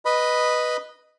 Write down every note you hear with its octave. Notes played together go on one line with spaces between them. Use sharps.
B4 D#5 B5